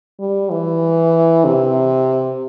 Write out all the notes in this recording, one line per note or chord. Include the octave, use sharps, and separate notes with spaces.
G3
E3
C3